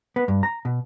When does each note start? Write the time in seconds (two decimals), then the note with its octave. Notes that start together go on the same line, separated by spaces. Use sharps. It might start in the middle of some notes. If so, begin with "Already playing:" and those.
0.16 B3
0.28 G2
0.43 A#5
0.65 B2